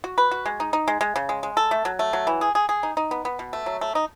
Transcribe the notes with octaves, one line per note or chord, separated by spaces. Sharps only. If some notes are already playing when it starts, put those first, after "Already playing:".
F#4
B4
F#4
G#3
D#4
D#4
G#3
G#3
C#3
G#3
G#3
A4
A3
F#3
A3
F#3
E3
G#4
G#4
G#4
D#4
D#4
B3
B3
B2
A3
F#3
A3
D#4